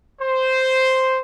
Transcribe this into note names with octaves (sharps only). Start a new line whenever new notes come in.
C5